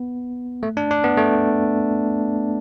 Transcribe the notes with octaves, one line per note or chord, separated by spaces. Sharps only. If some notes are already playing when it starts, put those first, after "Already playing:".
Already playing: B3
A3
D4
D4
B3
A3